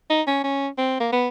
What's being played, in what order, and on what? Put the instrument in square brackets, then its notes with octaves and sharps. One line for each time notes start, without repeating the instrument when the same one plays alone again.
[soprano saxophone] D#4
C#4
C#4
C4
A#3
B3